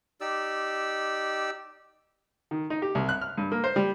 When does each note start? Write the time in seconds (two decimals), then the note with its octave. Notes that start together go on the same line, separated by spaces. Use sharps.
0.21 D#4 G4 D5 E6
2.51 D#3
2.70 D#4
2.82 G4
2.95 C2
3.09 F#6
3.21 F6
3.37 G2
3.52 A#3
3.64 C5
3.76 G3